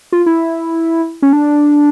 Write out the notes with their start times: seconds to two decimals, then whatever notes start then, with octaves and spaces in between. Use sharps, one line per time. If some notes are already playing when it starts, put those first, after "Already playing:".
0.12 F4
0.26 E4
1.22 C#4
1.33 D4